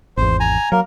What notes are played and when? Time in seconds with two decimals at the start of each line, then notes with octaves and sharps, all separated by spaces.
0.17 G#1 E2 C5
0.40 G#5 A#5
0.72 F#3 A#3 A#4